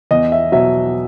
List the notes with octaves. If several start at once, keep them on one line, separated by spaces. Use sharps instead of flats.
E2 D#5
E5
B2 F#3 E5